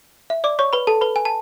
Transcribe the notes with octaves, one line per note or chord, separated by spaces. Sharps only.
E5
D5 D6
C#5 C#6
B4 B5
A4 A5
B4 B5
G#5
A5